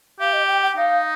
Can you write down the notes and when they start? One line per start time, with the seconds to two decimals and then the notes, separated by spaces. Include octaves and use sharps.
0.20 G4 F5
0.33 D#5
0.47 G5
0.63 G5
0.76 D#4 F5